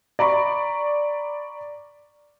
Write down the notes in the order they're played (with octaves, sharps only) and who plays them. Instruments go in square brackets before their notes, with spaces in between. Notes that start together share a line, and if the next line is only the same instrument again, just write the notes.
[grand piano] D5 A#5 B5 C#6